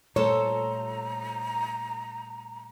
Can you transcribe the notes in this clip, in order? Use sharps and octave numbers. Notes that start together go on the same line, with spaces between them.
A#2 G3 A3 A4 C5 C#5 A5 A#5